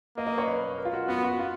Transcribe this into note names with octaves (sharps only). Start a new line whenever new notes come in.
A#3 D#5
D#5
C#5
B4
A#4
F4
F#4
B3 F#4
F#4
F4